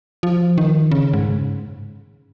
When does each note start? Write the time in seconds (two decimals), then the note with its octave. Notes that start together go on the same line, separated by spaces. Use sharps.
0.23 F3
0.58 D#3
0.91 C#3
1.13 G#2